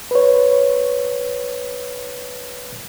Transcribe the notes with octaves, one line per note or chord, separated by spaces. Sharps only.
B4 C#5